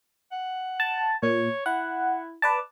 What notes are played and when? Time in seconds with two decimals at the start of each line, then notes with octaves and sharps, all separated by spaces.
0.31 F#5
0.80 A5
1.23 A#2 C#5
1.66 E4 F#5
2.42 B4 D5 A5